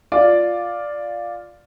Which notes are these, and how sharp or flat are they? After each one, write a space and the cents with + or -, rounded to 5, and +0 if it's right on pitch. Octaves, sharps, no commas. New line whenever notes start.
F4 +0 D5 +0